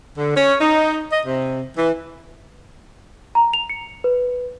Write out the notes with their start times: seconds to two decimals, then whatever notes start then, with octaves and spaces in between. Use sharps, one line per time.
0.17 D3
0.35 C#4
0.61 D#4
1.11 D#5
1.25 C3
1.77 E3
3.35 A#5
3.53 F7
3.69 C#7
4.04 B4